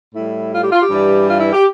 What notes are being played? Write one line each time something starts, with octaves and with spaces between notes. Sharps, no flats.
A2 G3 E4
F4
G4
F4
G4
G2 E3 G3
F4
E4
G4